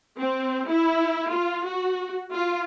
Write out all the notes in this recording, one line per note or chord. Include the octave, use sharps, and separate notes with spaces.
C4
E4
F4
F#4
F4